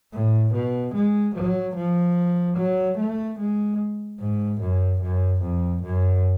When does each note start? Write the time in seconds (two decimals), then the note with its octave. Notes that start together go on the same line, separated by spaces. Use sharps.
0.12 A2
0.54 B2
0.94 G#3
1.35 F#3
1.75 F3
2.57 F#3
2.97 A3
3.39 G#3
4.19 G#2
4.60 F#2
5.01 F#2
5.41 F2
5.82 F#2